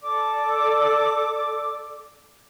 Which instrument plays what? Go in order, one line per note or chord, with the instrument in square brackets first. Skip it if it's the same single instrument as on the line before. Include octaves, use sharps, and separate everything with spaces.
[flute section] A4 D5 D6